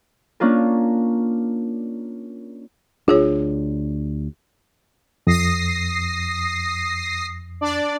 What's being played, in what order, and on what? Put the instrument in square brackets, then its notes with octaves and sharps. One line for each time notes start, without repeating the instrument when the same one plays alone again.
[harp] A#3 C#4 D4 F4 A#4
[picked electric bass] D2 D4 [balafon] F4 G#4 C#5
[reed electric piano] F2 [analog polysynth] D#6 A#6 C7
[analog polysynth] D4 D5